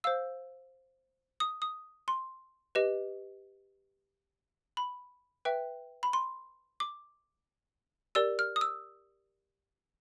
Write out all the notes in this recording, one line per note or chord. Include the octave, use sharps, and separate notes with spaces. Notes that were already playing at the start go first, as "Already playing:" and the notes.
C5 F5 E6
D#6
D#6
C6
G4 B4 D#5
B5
B4 E5 G5
B5
C6
D6
G4 A#4 D5 E6
F6
D#6
E6